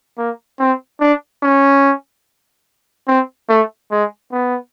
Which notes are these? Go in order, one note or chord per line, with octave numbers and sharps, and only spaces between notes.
A#3
C4
D4
C#4
C4
A3
G#3
B3